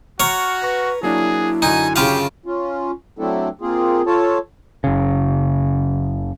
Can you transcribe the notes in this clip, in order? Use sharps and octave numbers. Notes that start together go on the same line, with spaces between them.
F#4 C#5 A#5 F6 C#7
B4 C#6 A#6
F#3 A#3 D4 E4 G#4
F#2 D3 D#4 F#4 G#5
C#3 F4 G4 F5
C#4 F4
F#3 A3 C4 D4 E4 A4
A#3 C4 F4 G#4
F4 A4 C#5 A5
F#1 C#3